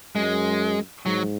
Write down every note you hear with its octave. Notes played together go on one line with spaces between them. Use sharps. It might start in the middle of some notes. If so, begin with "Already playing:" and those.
F#2 G#3
G#2 F#3